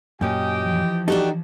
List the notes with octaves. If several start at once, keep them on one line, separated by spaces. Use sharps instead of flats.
F#2 A#2 C#4 G4 D#5 G5
E3 F3
D4 D#4 F#4 G4 A4